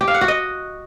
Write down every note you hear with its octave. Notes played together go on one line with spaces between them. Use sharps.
G4
F5
F#5
F#4
D#5